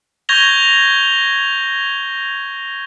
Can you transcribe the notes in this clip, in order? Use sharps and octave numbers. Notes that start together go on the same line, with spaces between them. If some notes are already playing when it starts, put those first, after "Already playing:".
C#6 G6 G#6 A#6 F7 G7